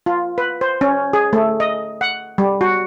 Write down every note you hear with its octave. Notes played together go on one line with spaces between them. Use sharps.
F4
B4
C5
C#4
G#4
A3
D#5
F#5
G3
F#4